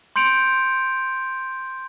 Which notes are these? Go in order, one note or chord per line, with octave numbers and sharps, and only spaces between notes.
C6 G6 C#7 D7 F7